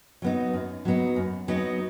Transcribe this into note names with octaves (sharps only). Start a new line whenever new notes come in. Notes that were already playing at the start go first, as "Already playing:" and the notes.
F#3 B3 D#4
F#2
F#3 B3 D#4
F#2
F#3 B3 D#4